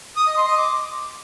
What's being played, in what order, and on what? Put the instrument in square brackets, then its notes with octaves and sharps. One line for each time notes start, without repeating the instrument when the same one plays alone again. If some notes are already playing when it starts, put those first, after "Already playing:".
[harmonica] D#6
D#5
C6
D#5
D6